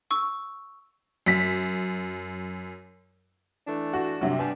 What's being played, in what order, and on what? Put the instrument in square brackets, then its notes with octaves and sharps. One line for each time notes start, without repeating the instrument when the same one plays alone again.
[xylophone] C#6 E6
[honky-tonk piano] F#2 B6
[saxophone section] E3 A3 D4
[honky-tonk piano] F#4
G2 C3 F#3
[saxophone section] G3 B3 D4 [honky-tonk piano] G#5